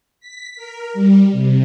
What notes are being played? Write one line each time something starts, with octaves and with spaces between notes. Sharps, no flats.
B6
A#4
G3
C3